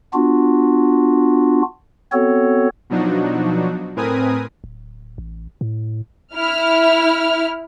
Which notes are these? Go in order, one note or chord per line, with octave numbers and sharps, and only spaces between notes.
B3 D4 F4 F#4
B3 C4 F#4 A4 C#5
B2 F3 F#3 D4 D#4 F#4
A2 C4 A#4 B4 G#5 D#6
D1
A1
A2
E4 F6